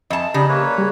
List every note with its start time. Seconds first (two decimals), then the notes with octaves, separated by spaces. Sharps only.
0.10 F2 D#5 E5 G#5 A5
0.34 C#3 D#4 G4 D5 D#5
0.49 A#3 B4 C#5
0.78 G3 G#4